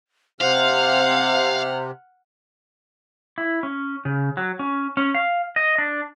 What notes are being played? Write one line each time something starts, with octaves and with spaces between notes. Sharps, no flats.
C3 C5 F5 F#5 F6
E4
C#4
C#3
F#3
C#4
C#4
F5
D#5
D4